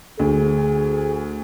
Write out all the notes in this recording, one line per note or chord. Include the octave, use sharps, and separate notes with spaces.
D2 G#4